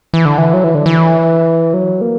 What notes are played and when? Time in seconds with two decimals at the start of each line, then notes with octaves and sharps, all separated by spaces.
0.13 E3
0.25 D3
0.38 E3
0.54 F#3
0.64 E3
0.75 D3
0.86 E3
1.74 F#3
2.01 A#3